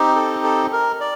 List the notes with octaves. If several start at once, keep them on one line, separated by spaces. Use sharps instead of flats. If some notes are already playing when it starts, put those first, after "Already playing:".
Already playing: C4 D#4 G4
A4
A4
A#4
D5